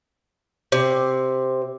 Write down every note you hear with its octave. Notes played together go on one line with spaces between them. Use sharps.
C3